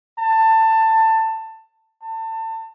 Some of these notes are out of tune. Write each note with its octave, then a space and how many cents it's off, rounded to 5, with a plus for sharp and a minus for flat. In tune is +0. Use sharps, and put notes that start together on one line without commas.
A5 +20
A5 +30